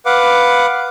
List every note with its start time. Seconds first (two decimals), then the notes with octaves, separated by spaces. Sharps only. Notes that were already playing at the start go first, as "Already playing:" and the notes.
0.06 B4 F5 F#5 D6